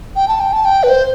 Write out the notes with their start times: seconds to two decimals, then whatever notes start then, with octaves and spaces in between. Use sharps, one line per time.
0.16 G5
0.28 A5
0.40 G5
0.53 A5
0.65 G5
0.83 B4
0.89 C5